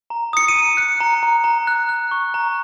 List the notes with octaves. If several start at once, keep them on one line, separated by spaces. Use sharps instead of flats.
A#5
D#6 C#7
D#7
A#5
F#6 C#7
A#5
A#5
A#5
F#6
F#6
C#6
A#5